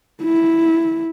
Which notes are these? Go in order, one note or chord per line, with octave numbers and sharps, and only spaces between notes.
E4